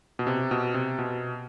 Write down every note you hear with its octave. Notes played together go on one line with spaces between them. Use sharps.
B2
C3
B2
C3
B2